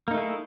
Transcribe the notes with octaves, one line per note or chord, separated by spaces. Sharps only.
A3 A#3 D#4 E4 G#4